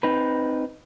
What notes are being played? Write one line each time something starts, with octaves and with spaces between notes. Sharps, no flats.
C4 D#4 B4